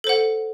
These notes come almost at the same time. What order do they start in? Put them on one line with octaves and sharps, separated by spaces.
A4 C5 F#5